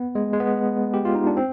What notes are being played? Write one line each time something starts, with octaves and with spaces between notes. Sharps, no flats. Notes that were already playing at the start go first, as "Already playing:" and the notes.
Already playing: B3
G#3
G#3
B3
G4
F4
D#4
D4
C4